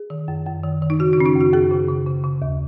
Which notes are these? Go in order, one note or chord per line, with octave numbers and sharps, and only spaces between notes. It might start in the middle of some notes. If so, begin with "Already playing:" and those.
Already playing: G#4
D#3
F#2
F#2
D#3
D#3
D#4
C#3 F#4
D#4
C#3 C#4
D#4
F#2 F#4
F#2 G#4
C#3
C#3
C#3
C#3
D#2